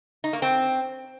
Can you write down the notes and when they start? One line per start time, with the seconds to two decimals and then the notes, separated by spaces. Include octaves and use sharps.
0.24 D#4
0.33 A#3
0.42 C4